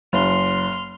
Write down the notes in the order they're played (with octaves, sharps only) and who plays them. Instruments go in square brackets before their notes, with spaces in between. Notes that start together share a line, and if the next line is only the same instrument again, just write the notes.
[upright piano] F#1 [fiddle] C6 F6